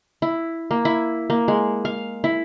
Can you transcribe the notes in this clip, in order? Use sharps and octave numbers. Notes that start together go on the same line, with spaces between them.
E4
A#3
E4
A#3
G#3
F5
E4